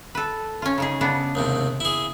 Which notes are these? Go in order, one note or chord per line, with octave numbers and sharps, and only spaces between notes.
A4 B4
C#4 F4
C#3 D#4 G#4
C#3 B3 D4
D#2 G#2 C3
E4 G#4